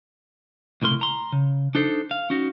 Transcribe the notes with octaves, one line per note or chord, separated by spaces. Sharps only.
C#2 A2 C3 A#4 C6
A#5 C6
C#3
D4 D#4 A4 C5
F5
C#4 D#4 F#4